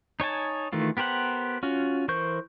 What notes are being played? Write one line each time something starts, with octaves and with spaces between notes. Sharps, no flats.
D#4 C#5 G#5 A5
D#3 E3 A3 F4
B3 G4 A#4 C5 F#5
C#4 F4 F#4
E3 A#4 C5 C#6 G6